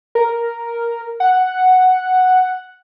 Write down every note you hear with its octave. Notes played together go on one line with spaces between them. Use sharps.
A#4
F#5